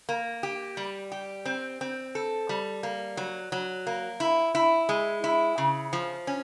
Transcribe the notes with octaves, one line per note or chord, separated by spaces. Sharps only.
A#3
G4
G3
G4
C4
C4
A4
G3
A#3
F#3
F#3
A#3
E4
E4
G#3
E4
C#3
F3
C#4